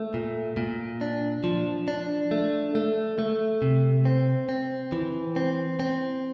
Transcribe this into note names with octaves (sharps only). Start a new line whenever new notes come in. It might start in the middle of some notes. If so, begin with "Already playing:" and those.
Already playing: A3
A#2
A#2
D4
F3
D4
A3
A3
A3
C3
C4
C4
E3
C4
C4